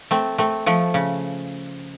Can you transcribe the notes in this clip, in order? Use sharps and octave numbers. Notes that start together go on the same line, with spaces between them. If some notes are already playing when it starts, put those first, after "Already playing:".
A3 C4
A3 C4
F3 A3
C#3